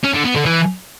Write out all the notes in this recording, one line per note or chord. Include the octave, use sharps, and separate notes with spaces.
C#4
D3
B3
D3
E3